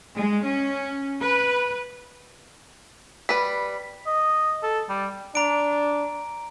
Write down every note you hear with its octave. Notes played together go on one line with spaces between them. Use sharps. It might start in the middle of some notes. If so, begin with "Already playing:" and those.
G#3
C#4
B4
G3 B4 B6
D#5
A4
G3
D4 A#5 D7